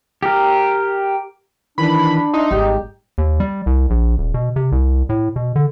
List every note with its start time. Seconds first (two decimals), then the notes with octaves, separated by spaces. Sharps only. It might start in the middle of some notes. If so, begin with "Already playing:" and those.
0.23 G4 A#4
1.78 D#3 E3 D4 B5
2.34 D#4 E5 C6
2.51 G#1 G3 G#3 G4
3.18 D#2
3.40 G3
3.66 C2
3.90 A#1
4.18 D#1
4.34 B2
4.56 C3
4.72 C2
5.09 A2
5.36 B2
5.56 D3